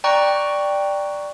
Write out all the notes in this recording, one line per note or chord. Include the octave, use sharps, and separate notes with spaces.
D5 G5 A#5 C#6 F#6